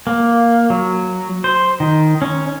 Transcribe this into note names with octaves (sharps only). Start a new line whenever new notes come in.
A#3
F#3
C5
D#3
C#4